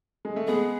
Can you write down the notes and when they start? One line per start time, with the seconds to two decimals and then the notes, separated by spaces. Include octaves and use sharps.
0.25 G#3
0.36 A3
0.47 G#3 B3 G#4